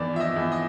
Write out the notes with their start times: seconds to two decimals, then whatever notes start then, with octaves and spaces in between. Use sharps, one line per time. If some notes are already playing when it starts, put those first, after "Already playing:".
Already playing: E2 D#3 D5
0.13 F3 E5
0.20 D#5
0.36 E2
0.52 D#5